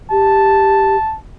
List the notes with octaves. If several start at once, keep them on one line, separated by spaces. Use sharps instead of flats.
G4 A5